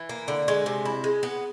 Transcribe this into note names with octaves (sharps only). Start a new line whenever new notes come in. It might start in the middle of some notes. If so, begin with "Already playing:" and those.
Already playing: E3
A#3
D3
G#3
C3
E4
G#3
B3